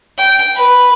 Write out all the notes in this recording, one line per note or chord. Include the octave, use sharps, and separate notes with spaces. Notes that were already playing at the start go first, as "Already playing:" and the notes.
G5
B4